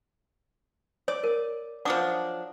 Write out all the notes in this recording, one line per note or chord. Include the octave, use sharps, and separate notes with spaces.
C#5 D5
A#4
F3 F#3 D4 F#5 D6 D#6